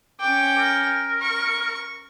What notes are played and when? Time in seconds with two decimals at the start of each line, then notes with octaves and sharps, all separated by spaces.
0.20 C#4 G5 D6
0.58 A#4
1.22 C#6